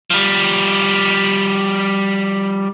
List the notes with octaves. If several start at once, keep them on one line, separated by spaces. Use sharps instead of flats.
F3 G3